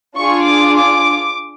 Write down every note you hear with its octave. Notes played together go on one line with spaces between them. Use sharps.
D4 F4 G#4 C#6
D6
D6